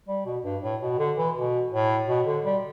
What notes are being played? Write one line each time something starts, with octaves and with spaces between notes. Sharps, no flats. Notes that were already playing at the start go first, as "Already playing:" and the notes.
G3
B2
G2
A2
B2
D3
E3
B2
A2
B2
D3
G3